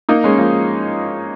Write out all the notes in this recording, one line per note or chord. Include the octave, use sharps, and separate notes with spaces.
A#3 D#4
G#3 C#4
F3 A#3